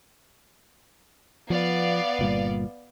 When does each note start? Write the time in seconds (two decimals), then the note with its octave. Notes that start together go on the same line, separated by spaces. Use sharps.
1.50 F3 B3 D5 F5
2.19 G1 A#2 G3